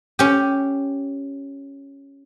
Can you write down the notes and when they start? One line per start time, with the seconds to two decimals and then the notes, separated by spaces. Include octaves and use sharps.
0.19 C#4 G4